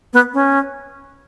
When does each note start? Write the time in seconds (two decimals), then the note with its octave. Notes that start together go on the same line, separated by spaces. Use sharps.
0.13 B3
0.34 C#4